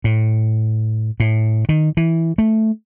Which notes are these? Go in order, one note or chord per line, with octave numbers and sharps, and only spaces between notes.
A2
A2
D#3
E3
A3